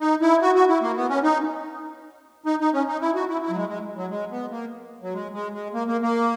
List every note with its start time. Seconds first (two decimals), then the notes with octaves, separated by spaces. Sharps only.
0.01 D#4
0.21 E4
0.42 F#4
0.55 F#4
0.69 E4
0.82 A#3
0.97 B3
1.10 C#4
1.23 D#4
2.46 D#4
2.61 D#4
2.73 C#4
2.88 D#4
3.01 E4
3.15 F#4
3.29 E4
3.42 E4
3.50 F#3
3.56 G#3
3.69 G#3
3.97 F#3
4.10 G#3
4.31 B3
4.51 A#3
5.02 F#3
5.13 G#3
5.34 G#3
5.54 G#3
5.74 A#3
5.88 A#3
6.02 A#3